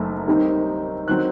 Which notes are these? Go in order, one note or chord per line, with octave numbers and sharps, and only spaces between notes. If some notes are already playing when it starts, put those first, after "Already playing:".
Already playing: F#1 F#2 D#3 A3 D#4
D#2 D#3 G3 C4 D#4
D#3 F#3 C4 D#4 F#6